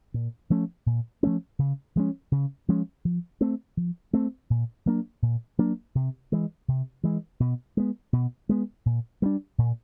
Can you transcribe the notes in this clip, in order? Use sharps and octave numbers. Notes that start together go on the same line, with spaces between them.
A#2
F3 A3 C#4
A#2
F3 A3 C#4
C#3
F3 G#3 C#4
C#3
F3 G#3 C#4
F3
A3 C4
F3
A3 C4
A#2
F#3 A#3 D4
A#2
F#3 A#3 D4
C3
E3 G#3
C3
E3 G#3
B2
G#3 B3
B2
G#3 B3
A#2
G3 A#3 D4
A#2